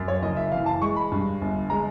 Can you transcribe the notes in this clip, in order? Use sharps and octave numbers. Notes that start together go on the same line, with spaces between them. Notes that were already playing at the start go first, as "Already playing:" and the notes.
Already playing: F#2
C#5
F#1 D#5
E5
E3 F5
A5
G#3 C#6
B5
G2
G1
G#3 A#5